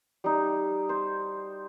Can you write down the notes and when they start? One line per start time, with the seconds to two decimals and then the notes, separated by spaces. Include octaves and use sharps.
0.24 G3 D#4
0.89 C5